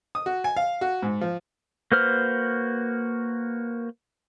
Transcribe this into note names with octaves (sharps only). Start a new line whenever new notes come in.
D#6
F#4
G#5
F5
F#4
G#2
F3
A#3 F#4 B4 C5 F6